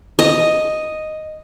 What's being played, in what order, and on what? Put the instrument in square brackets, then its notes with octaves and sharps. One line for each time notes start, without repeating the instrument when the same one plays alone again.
[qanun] D#5